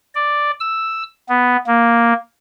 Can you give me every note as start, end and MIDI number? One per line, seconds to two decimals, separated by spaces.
0.15 0.51 74
0.60 1.03 88
1.29 1.57 59
1.67 2.13 58